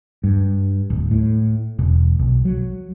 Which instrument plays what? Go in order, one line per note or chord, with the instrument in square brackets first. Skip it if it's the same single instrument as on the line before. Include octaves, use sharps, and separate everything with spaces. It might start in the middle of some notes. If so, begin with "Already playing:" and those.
[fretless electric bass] G2
D1
A2
E1
B1
F#3